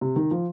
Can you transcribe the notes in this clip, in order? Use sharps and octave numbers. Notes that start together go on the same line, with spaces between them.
C3
D#3
F3